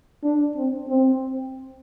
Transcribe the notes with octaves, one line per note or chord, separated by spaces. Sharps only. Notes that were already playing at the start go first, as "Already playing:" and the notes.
D4
C4
C4